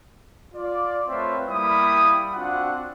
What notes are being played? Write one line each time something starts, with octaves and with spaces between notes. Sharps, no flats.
F4 D5
A3 C4 F4 B4 C#5 E5
G3 A#3 E4 B5 D#6
C4 D4 F4 F#4 F#5